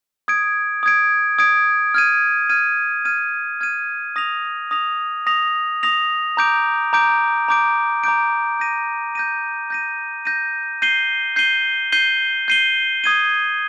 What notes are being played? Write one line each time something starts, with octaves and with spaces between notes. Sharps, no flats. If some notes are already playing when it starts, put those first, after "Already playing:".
D#6 G#6 D7
D#6 G#6 D7
D#6 G#6 D7
F6 G#6 D#7
F6 G#6 D#7
F6 G#6 D#7
F6 G#6 D#7
D#6 A#6 F7
D#6 A#6 F7
D#6 A#6 F7
D#6 A#6 F7
A#5 D6 G6 D7
A#5 D6 G6 D7
A#5 D6 G6 D7
A#5 D6 G6 D7
G6 A#6 D#7
G6 A#6 D#7
G6 A#6 D#7
G6 A#6 D#7
G6 C7 D#7 G7
G6 C7 D#7 G7
G6 C7 D#7 G7
G6 C7 D#7 G7
D#6 G#6 D#7 G7